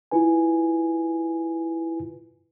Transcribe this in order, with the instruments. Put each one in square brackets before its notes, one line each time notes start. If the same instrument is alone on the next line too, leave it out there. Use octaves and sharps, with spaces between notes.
[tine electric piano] E4 F4 B4 G#5